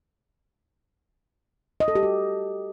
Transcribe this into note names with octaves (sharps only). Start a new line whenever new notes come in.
D#5
A4
G4
F#4